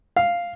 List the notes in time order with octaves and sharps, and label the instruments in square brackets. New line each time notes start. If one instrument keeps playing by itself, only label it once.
[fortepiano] F5